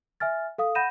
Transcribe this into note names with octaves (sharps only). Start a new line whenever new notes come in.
E5 G#5 F6 A6
A4 F5 D#6
F#5 B5 G6 A#6 D#7 E7